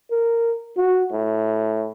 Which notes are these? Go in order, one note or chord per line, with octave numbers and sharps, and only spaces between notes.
A#4
F#4
A2